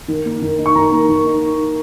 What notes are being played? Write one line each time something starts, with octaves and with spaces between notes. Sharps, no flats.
D#3
A#3
D#3
D#4
C#6
D#3 A#5
A#3
D#3
D#4